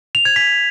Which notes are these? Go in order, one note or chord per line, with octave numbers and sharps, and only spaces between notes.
F7
G#6
B6